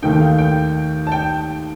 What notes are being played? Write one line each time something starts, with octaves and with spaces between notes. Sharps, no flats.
D#2 D#3 A3 D#4 G5
F5
G5
A5
G5